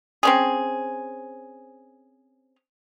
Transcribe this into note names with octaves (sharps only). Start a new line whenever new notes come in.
C4 C#4 G#4